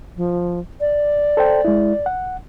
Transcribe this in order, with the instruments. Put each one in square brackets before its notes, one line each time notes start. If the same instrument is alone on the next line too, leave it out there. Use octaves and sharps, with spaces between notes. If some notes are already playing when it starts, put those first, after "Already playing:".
[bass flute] F3
D5
[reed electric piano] A4 C5 G5
G#3 E4
F#5